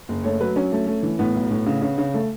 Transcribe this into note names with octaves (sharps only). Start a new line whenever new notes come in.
F#1
A3 C#5
F#3 B4
F#3 C#4
A3
A3
E3
A2 B3
B1
A2
C#3
C#3
C#3
A3